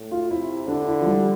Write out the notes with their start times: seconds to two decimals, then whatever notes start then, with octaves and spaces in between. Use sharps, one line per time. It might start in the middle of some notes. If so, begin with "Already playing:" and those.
Already playing: A2
0.12 F4
0.31 C3 E4
0.68 D3 D4
0.87 E4
1.01 F3
1.06 G3